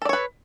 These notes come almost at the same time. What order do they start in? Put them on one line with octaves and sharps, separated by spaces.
A4 D5 C#5 B4